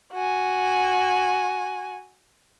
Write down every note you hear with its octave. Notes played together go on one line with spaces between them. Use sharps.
F#4 G#5